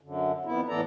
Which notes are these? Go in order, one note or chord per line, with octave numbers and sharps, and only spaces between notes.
F#2 D3
F2 B3 E4
A2 E3 B3 A4 D5 A#5